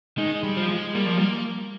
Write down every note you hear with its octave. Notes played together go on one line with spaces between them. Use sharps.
D#3 G#3
G3
F3
G#3
G3 A#3
F3
G3
A#3